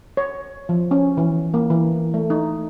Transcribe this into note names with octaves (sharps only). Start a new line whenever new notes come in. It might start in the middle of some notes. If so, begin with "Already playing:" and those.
C#5
F3
C#4
E3
A#3
E3
A3
D#4